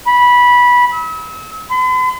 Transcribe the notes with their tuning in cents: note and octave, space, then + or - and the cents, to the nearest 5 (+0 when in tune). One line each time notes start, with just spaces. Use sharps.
B5 -15
E6 -40
B5 +45